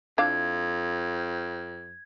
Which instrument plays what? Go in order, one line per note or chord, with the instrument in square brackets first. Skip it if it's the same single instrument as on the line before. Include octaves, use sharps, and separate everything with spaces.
[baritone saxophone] F2 [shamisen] D4 E4 F5 [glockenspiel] G#6